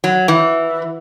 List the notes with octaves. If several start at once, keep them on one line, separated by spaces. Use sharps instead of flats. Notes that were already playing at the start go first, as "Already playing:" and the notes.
F#3
E3